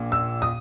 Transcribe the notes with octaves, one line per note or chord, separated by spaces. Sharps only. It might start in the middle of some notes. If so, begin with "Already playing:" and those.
Already playing: A#1 A#2
E6
D#6